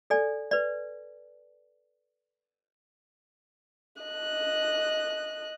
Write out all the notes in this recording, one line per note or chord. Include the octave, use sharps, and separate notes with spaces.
A4 D5 G#5
B4 D5
D#5 F#6